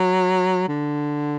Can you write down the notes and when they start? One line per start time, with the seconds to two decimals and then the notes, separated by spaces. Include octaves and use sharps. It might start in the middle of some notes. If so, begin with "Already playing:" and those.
Already playing: F#3
0.68 D3